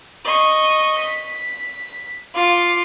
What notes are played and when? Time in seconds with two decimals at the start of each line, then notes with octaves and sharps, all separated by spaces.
0.25 D#5 C#6
0.98 B6
2.34 F4 D6